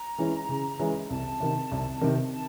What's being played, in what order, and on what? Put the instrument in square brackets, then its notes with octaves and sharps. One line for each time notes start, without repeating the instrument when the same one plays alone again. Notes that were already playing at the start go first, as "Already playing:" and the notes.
Already playing: [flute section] A#5
[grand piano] E3 G#3 C#4 E4
C#3
E3 G#3 C#4 E4
[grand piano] C2 [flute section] A5
[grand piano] C3 D#3
C2
C3 D#3
[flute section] A5